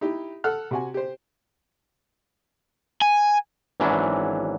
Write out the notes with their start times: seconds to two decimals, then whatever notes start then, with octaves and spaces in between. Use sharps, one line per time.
0.01 D#4 E4 G4
0.44 A4 F#5 F6 F#6
0.71 C3 F#4 G#5
0.94 G4 C5
3.01 G#5
3.80 G#1 E3 F#3 C#4 D4 E4